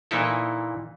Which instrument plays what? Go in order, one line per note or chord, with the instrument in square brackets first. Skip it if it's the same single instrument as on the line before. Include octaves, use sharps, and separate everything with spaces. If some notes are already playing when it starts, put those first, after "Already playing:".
[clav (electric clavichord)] A#2 E3 A#3 D#4 E4 A4